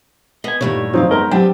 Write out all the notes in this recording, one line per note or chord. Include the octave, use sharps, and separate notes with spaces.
B3 D#5 G#5
G2 A#2 D#3 G3 A3 D#4 E4 C#5
D2 F3 F#3 C4 D#4 F5
G#3 B3 D#4 A#4 C5
F#3 G3 B3 C4 D4 G5